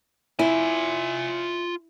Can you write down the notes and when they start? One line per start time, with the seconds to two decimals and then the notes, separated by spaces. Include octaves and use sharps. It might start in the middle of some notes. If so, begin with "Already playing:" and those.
0.39 E4 F4 G#5